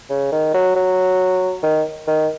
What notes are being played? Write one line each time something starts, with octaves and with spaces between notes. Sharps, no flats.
C#3
D#3
F#3
F#3
D#3
D#3